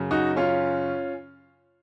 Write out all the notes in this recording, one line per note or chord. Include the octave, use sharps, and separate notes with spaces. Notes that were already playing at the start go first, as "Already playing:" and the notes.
Already playing: F#2 C#3
D#4 F#4
C#4 F4